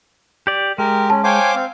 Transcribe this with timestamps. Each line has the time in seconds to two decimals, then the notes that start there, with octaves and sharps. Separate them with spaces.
0.47 G4 D5
0.78 G#3 G4 A#4
1.10 C#4 A5
1.24 C5 C#5 F5 G5 G#5 D6
1.55 C4 F5